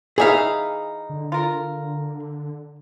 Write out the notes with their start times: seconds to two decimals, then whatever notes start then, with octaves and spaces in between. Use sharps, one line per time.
0.18 E3 D#4 G#4 E5 F5
1.09 D3
1.32 F4 A#4